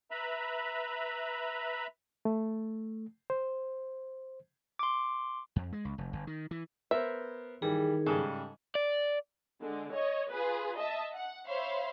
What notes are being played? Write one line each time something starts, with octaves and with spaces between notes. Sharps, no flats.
B4 E5 A#5 B5
A3
C5
C6 D6
F2
G#3
C#2
F1
G1
D#3
E3
B3 A#4 C5 E5
D#3 E3 G3 G#4
G#2 C#3 G3 A4
D5
D3 G#3
C#5 D#5
F4 G#4 B4
D#5 E5 A5
F#5
C5 C#5 E5 F5 B5 C6